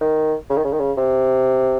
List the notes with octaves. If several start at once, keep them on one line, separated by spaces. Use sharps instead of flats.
D#3
C#3
D#3
C#3
D#3
C#3
C3